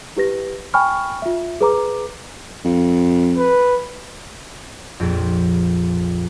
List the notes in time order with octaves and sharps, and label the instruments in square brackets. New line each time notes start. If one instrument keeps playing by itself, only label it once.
[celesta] E4 G4 B4 A#6
G5 G#5 B5 C#6 F6
F4 E5
G#4 B4 A#5 D6
[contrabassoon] F2
[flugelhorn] B4
[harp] A#1 F2